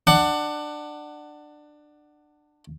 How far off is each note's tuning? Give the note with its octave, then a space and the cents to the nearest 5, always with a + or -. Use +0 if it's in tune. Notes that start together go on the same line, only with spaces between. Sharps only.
D4 +20 F#5 +15